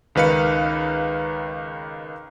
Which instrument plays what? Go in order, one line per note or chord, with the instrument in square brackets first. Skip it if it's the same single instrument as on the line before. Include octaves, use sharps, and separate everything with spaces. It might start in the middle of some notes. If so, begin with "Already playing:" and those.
[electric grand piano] C#2 D#3 B4 F5 C#7